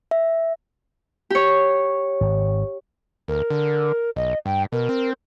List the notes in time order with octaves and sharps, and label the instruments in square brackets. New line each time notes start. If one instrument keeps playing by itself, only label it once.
[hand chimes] E5
[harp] G4 C#5
[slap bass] G#1
[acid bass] D2 [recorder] A#4
[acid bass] D3
[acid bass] B1 [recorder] D#5
[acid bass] G2 [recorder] G5
[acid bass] B2 [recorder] A#4
[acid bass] C4